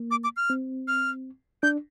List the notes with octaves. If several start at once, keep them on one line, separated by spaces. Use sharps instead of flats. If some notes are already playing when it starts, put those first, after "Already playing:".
Already playing: A#3
D6
D6
F6
C4
F6
D4 G6